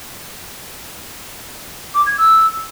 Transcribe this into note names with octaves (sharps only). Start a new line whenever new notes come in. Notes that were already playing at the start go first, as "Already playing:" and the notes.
D6
G#6
E6